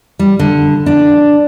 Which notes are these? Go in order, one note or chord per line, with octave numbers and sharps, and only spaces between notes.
G3
D3
D4